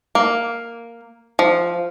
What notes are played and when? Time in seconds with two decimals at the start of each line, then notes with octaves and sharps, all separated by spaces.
0.15 A#3
1.39 F3